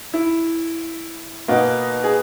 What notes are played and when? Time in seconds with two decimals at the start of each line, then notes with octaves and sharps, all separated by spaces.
0.14 E4
1.48 B2 A#3 D#4 F#4
2.04 G#4